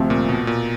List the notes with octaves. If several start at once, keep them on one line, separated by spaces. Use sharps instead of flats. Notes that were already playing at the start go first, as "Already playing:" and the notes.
Already playing: D2 C3 F3
A#2
B2
A#2